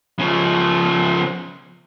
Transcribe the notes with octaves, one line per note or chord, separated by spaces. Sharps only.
C#3 F3